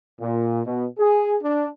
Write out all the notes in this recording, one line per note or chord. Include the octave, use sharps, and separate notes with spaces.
A#2
B2
G#4
D4